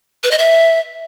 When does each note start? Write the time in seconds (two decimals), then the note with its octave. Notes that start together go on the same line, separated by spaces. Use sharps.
0.24 B4
0.31 D#5
0.39 E5